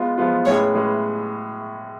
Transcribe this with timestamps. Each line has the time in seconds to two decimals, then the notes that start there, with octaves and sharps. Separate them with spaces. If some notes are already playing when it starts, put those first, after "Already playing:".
Already playing: G#3 B3 F4
0.18 F3 G#3 B3 F4
0.46 A2 G#3 C#4 G#4 B4 C#5
0.74 A2 G#3 C#4 G#4 B4